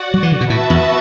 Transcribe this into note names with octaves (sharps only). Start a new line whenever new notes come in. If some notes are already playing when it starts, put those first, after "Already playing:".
Already playing: F#4 D5 F#5
F#3
E3
D3
B2
A2 B3 F#4 B4 E5 A5
E2